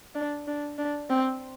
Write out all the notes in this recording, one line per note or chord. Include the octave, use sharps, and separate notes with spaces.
D4
D4
D4
C4